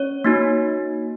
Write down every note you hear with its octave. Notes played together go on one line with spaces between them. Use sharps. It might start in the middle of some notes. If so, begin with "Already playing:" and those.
Already playing: C#4 C#5
A#3 D#4 F#4